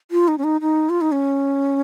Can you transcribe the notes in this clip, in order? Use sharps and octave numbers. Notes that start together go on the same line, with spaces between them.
F4
D#4
C#4
D#4
D#4
F4
D#4
C#4